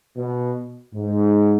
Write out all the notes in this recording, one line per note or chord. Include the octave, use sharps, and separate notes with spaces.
B2
G#2